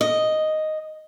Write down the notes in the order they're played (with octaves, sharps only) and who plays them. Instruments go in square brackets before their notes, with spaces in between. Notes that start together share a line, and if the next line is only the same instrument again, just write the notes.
[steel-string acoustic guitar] D#5